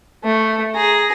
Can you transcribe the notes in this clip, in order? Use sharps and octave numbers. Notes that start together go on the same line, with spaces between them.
A3
G#4 A#5